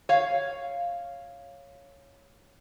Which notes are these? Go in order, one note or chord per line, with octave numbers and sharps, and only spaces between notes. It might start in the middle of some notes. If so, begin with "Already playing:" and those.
C#5 F5